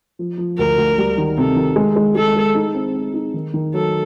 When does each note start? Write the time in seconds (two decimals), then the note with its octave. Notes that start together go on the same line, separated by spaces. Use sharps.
0.19 F3
0.38 F3
0.58 D2 A#4
0.77 D2
0.98 G3
1.18 D#3
1.38 C3 A4
1.56 D#3
1.76 G#3
1.96 G#3
2.15 G#3 A4
2.36 G#3
2.55 D#4
2.75 C4
2.95 C4
3.14 D#4
3.34 D#3
3.54 D#3
3.74 F#3 A4